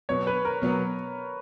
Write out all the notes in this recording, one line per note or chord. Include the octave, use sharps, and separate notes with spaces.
B2 F#3 B3 C#5
B4
A#4
B2 F#3 B3